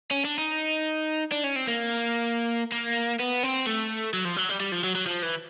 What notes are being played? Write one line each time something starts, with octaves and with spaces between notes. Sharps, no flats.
C#4
D4
D#4
D4
C#4
C4
A#3
A#3
B3
C4
A3
F#3
F3
F#3
G3
G3
F3
F#3
F#3
F3
E3